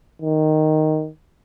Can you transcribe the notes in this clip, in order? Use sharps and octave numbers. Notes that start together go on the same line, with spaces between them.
D#3